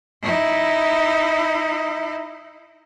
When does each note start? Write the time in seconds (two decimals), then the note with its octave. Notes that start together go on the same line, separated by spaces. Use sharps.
0.22 D#4 E4